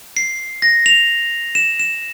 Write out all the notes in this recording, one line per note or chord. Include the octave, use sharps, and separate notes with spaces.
C7
A#6
F7
E7
E7